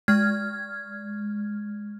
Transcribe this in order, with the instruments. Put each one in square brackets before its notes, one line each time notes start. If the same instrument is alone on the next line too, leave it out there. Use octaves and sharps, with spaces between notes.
[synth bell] G#3 F6 G#6